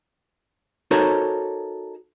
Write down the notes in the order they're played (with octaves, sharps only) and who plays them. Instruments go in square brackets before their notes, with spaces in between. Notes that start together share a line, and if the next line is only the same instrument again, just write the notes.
[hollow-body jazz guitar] D#4 F#4 A4 A#4 C5 C#5